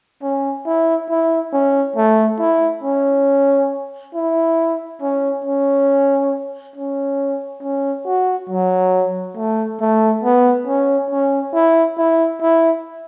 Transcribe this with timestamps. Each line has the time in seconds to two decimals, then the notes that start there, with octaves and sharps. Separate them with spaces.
0.22 C#4
0.66 E4
1.10 E4
1.53 C#4
1.96 A3
2.40 E4
2.84 C#4
4.15 E4
5.02 C#4
5.45 C#4
6.76 C#4
7.63 C#4
8.06 F#4
8.50 F#3
9.37 A3
9.81 A3
10.24 B3
10.67 C#4
11.11 C#4
11.54 E4
11.98 E4
12.41 E4